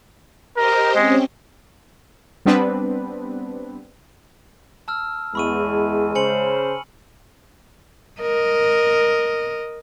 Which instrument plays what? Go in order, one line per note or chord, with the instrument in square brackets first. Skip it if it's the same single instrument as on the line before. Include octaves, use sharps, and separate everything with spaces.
[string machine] G4 C5 D#5 [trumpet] A#4
[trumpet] G#3 [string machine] C4 C#4
[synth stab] G3 B3 C4 D4 B4
[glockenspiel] A5 E6 F6
[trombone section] E2 [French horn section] G#3 [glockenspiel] B5 C#6 D#7
[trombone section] C#3 C5 [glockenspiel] G#5 C#7 F#7
[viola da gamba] A#4 D#5